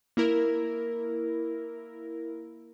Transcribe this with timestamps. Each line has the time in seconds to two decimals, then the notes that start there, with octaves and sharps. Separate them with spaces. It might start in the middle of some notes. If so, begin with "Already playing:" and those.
0.17 A#3 E4 A#4